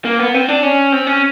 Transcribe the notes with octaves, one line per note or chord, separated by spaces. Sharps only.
A#3
B3
C4
D4
C#4
C4
C#4